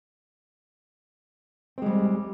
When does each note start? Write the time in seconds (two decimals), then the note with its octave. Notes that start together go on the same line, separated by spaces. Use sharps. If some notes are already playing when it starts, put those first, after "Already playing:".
1.78 C4
1.82 G#3
1.86 G3